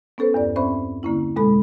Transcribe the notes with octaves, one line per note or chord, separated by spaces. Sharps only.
B3 C#4 A4 B4 C5
E2 G2 D5
C4 C#4 C5 E5 B5
D3 A#3 C#4 E4
F2 B2 G#3 A4 B5